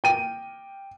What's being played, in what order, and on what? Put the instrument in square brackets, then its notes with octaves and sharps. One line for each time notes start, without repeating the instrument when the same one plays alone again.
[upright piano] G5 D#7